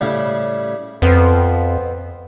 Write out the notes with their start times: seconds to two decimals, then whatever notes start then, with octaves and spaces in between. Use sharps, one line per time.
0.01 A2 C#3 G3
1.02 F2 B3 C4